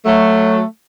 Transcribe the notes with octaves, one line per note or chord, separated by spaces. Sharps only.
F#3 A3